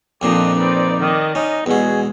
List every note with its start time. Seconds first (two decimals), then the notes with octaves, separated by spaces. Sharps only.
0.22 F2 A#2 F3 D4 D#4 D#5 D6
0.57 C4 D#4 B4 D5
1.00 D#3 D5 D#5
1.35 C#4 D#4
1.66 E2 B2 G#3 F#4 G#4